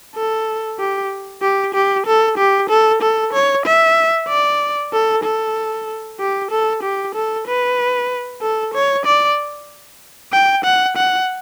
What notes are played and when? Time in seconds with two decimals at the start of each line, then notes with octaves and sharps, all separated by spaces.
0.15 A4
0.79 G4
1.42 G4
1.74 G4
2.06 A4
2.38 G4
2.69 A4
3.02 A4
3.33 C#5
3.65 E5
4.28 D5
4.93 A4
5.23 A4
6.20 G4
6.51 A4
6.83 G4
7.15 A4
7.47 B4
8.42 A4
8.74 C#5
9.05 D5
10.33 G5
10.64 F#5
10.97 F#5